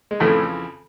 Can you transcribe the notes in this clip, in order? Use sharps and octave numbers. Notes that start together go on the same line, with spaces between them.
G#3
F2 A2 C#3 E3 A3